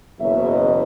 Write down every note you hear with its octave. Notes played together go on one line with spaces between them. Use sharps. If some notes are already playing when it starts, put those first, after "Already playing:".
F#1 E2 B2 F#3 E5
D#5